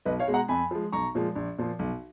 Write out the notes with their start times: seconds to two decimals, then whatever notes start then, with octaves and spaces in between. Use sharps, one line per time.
0.06 B1 B4 D#5
0.20 C#5 F5
0.28 B2 G#3
0.34 F#5 A#5
0.48 F2 G#5 B5
0.71 F3 G#3
0.92 B1 A#5 C#6
1.15 A#2 F3 G#3
1.35 A#1
1.59 A#2 F3
1.79 B1